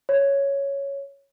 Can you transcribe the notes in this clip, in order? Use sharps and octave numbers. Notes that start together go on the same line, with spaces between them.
C#5